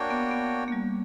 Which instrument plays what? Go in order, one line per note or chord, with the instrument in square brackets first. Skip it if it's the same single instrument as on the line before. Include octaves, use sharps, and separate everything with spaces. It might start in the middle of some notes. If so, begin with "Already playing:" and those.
Already playing: [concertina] A#3 D4 F#4 C#5 G5
[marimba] B3
B3
A#3
G3